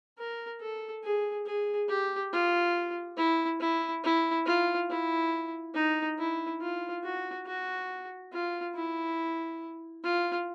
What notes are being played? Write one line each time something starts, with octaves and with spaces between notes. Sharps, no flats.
A#4
A4
G#4
G#4
G4
F4
E4
E4
E4
F4
E4
D#4
E4
F4
F#4
F#4
F4
E4
F4